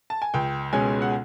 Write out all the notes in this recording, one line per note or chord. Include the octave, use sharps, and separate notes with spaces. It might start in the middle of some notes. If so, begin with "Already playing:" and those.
A5
G#5
C#2 G5
B2 G#3 C#4 G#5
F#5